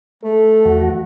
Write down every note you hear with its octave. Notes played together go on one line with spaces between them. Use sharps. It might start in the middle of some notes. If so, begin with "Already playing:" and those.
A3 A4
E2 F#4